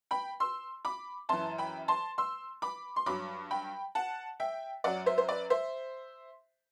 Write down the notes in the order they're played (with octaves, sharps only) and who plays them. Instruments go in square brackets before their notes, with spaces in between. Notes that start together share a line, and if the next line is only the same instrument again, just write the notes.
[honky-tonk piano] G5 B5
C6 E6
B5 D6
F#2 E3 A5 C6
G5 B5
A5 C6
C6 E6
B5 D6
C6
G2 F#3 B5 D6
G5 B5
F#5 A5
E5 G5
F#2 F#3 D5 F#5
C5 E5
C5
B4 D5
C5 E5